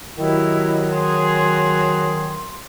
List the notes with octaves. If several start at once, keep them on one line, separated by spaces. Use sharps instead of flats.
D#3 F#3 E4 G4 D#5
G#4 C6